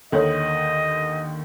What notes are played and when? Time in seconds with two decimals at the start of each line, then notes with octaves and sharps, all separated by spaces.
0.12 D#2 D3 D#3 A4 C#5 D#5